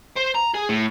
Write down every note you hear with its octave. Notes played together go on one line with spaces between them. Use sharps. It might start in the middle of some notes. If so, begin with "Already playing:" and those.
C5
A#5
G#4
A2